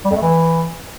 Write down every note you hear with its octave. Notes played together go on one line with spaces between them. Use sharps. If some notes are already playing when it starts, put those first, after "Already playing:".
G3
F2
A3
E3